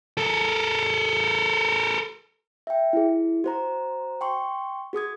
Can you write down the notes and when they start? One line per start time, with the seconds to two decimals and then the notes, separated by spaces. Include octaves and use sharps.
0.17 A4 A#4
2.67 E5 G5
2.93 E4 G#4
3.44 F#4 C5 A#5
4.21 G5 C6 C#6
4.93 F#4 G#4 D#6 G#6